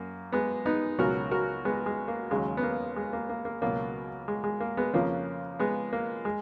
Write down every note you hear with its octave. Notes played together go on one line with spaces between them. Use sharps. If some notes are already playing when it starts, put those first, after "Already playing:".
Already playing: F#2 A#3
G#3 B3
B3 D#4
C#2 B2 F#3 F#4 A#4
F#4 A#4
G#3 B3
G#3
A#3
D#2 C#3 F#3 G#3
B3
A#3
G#3
A#3
A#3
A#3
C#2 B2 F#3 A#3
G#3
G#3
A#3
G#3 B3
F2 C#3 F3 A#3 C#4
G#3 B3
A#3
G#3